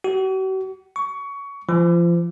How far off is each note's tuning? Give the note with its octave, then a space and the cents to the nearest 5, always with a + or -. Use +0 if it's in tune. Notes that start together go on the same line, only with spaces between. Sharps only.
F#4 +45
C#6 +20
F3 -30